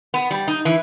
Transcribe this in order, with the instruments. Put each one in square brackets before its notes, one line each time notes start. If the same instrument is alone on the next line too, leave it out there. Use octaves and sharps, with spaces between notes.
[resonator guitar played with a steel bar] B3
G3
D#4
E3